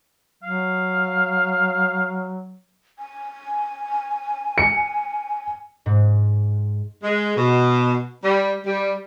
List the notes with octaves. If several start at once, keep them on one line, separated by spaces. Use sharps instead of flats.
F#3 F5
G#5
C#7
G#2
G#3
B2
G3
G3